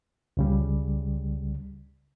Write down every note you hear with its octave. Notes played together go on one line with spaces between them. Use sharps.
C#2 C#3 G3